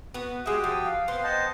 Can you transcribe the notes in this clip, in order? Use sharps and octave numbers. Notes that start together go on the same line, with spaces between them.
B3 F#4
G#3 F#4 G4 E5 G5 D#6
F3
F5
B3 C4 C6
C5 D#5 F#5 A5